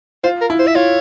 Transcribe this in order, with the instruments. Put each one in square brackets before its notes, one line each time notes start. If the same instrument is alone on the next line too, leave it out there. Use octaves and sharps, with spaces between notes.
[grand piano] F4 [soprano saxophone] C5
[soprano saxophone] A#4
[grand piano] E4
[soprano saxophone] C5
E5
[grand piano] F4 [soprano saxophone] C#5